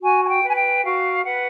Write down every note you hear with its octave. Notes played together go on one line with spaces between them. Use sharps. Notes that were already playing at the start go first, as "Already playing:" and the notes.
F#4 G#5
G#5
G5
B4
G#5
G5
F#4 F5
B4 F#5